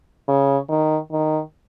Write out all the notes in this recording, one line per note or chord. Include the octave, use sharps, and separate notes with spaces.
C#3
D#3
D#3